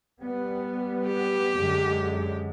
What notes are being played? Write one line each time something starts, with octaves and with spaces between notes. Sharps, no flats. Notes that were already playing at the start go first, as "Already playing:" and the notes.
G3 B3
G4
F#2 D3 G#3